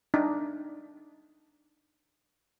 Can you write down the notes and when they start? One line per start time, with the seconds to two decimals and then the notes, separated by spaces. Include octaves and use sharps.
0.14 D4 D#4